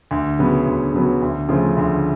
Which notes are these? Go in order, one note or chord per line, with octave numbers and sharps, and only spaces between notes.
D2
C#3 F#3 B3
D2
C#3 F#3 B3
D2
C#3 F3 A3 F4
D2